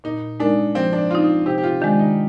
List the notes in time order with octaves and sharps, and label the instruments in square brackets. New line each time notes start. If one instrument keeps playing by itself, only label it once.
[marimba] A#2 [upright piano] D#4
[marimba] G#3 D#4 A#4 [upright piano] D4
[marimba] F3 [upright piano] C4
[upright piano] D4
[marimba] C4 D#4 [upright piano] F4
[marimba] C3 [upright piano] G4
[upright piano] G4
F4
[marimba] D#3 G#3 [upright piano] D4
[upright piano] D#4